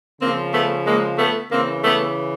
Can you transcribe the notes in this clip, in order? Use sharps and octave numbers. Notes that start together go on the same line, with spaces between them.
C#3 F3 A#3 C4
A3 B3
G#3 A#3
A3 B3
C#3 E3 A#3 C4
A3 B3